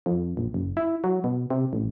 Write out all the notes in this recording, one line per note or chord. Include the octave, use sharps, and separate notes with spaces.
F2
A#1
F#1
E4
F#3
B2
C3
A1